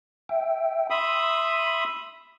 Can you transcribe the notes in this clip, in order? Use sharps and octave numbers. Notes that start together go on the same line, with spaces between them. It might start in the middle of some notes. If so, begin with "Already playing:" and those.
E5 G5
E5 B5 C6 D#6